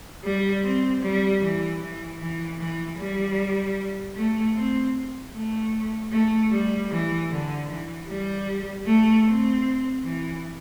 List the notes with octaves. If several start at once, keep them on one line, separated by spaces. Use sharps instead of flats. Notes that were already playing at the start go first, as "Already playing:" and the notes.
G3
C4
G3
E3
E3
E3
E3
G3
A3
C4
A3
A3
G3
E3
D3
E3
G3
A3
C4
E3